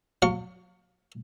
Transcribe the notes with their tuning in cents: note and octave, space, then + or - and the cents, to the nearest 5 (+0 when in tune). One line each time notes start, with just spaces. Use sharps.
F#3 -30 F5 +20 C#6 +15